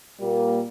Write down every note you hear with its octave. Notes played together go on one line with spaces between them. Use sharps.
A#2 G3 A#3